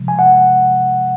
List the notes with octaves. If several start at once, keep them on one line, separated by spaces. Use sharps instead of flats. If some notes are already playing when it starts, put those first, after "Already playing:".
Already playing: C3 F3 G#3
G#5
F#5